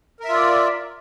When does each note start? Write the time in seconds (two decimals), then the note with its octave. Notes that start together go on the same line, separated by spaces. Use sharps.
0.20 A#4
0.25 E5
0.29 F4
0.33 D5